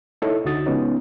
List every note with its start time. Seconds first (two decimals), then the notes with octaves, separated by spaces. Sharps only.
0.22 D#4 E4 A4 C#5 D#5
0.45 C#2 D3 D#4 F#4 D#6 A6
0.66 C#3 F3 G#3 B3 C#4 D#4